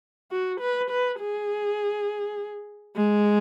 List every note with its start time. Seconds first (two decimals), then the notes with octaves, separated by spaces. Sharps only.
0.31 F#4
0.60 B4
0.90 B4
1.20 G#4
2.97 G#3